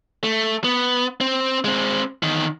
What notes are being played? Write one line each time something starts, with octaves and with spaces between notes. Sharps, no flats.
A3
B3
C4
G#3 C4
E2 D#3